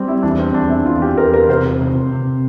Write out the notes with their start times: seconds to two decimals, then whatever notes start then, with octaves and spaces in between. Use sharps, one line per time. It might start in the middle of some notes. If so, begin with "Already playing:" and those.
Already playing: G3 C4
0.08 E4
0.23 E2 D4
0.39 C4
0.54 E2 D4
0.70 E4
0.86 E2 F4
1.02 G4
1.17 E2 A#4
1.34 A#4
1.48 C3 C5
1.80 C3
2.12 C3